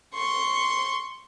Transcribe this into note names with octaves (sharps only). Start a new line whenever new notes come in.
C6 C#6